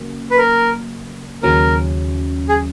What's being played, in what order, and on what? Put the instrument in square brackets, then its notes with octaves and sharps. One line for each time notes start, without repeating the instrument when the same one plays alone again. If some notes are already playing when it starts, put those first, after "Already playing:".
Already playing: [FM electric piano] C#3 F#3 A#3
[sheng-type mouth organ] B4
A#4
[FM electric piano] D#2 C#3 F#3 C#4 [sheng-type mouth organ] A#4
[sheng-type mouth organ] G#4